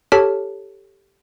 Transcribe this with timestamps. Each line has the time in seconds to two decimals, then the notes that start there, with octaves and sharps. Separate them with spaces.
0.12 G4 A4 C#5 A5 F6 B6